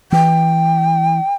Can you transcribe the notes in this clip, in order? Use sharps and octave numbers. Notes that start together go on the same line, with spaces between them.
E3 G5